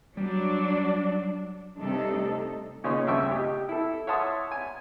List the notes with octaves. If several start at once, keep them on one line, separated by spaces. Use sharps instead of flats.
F#3 G3 D4
G2 C3 A3 D4 D#4 A4
A#2 C#3 C#4 D#4 C#5 C6
D2 G2 C#3 E5 G5 C#6
G4 D#5
E4 A4
C#5 E5 F#5 A5 C6 D#6
G#5